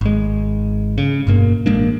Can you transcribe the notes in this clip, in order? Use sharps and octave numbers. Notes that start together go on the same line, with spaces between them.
G#1 G#3
C#3
G1 G2 B2 A#3
A1 G#3 A#3 D4